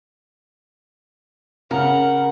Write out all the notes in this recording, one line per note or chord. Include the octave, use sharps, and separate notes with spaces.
C#3 A#4 F#5